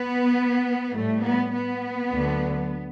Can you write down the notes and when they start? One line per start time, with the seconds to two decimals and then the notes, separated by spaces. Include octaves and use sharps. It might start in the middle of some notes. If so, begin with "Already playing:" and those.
Already playing: B3
0.93 A2 G3 A3
1.23 B3
1.52 B3
2.12 D2 D3 F#3